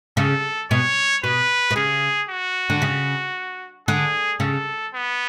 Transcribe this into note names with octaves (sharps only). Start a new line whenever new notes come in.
C#3 A4
B2 C#5
B2 B4
B2
C#3 G#4
F#4
D3
C#3
D3 G#4
C#3 A4
B3